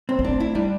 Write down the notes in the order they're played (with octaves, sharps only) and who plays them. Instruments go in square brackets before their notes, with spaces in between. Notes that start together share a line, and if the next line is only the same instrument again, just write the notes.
[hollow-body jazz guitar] C4
[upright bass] B3
[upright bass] A3 [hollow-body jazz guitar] D4
[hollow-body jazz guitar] E4
[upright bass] G3 [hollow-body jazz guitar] D4